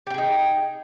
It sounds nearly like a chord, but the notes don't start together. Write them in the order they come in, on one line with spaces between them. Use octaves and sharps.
G4 G5 G#4 D#4